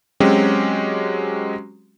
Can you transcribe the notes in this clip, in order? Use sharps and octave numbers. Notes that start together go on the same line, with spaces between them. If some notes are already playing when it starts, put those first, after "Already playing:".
F#3 G#3 C4 C#4 F#4 G4